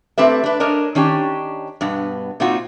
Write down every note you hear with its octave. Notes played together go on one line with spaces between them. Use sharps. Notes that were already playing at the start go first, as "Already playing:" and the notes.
A3 C4 G4 B4 E5
D4 B4
D4 A#4 C#5 D#5
D#3 C#4 D4 G4
G2 B2 B3
A#2 C4 D#4 F4 F#4